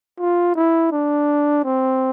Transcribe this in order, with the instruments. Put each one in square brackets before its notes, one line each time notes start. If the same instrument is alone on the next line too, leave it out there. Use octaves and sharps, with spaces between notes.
[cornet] F4
E4
D4
C4